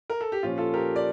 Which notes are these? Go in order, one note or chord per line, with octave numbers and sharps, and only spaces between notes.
A#4
A4
G4
A#2 F3 C#4 F4
F4 A4
G4 A#4
D5